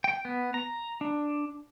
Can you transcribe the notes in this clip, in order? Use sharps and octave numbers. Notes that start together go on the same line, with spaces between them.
G5
B3
A#5
D4